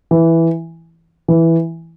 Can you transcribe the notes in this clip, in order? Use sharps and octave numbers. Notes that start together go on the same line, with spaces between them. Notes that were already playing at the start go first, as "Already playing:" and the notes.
E3
E3